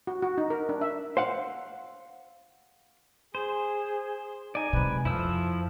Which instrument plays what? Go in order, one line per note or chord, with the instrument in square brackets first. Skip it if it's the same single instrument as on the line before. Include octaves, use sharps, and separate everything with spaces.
[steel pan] F#4
F#4
D#4
A#4
D4
E5
[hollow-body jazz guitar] C5 F5 F#5
[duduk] G#4 [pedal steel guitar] C5
[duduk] D#4 [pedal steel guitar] D5 G#5
[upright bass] C3 G#3 [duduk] B4
[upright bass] F2 [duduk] F3 [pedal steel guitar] E4 C5 E6